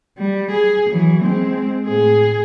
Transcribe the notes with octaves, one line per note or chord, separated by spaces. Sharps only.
G3
G#4
E3 F#3
G#3 C4
A2 G#4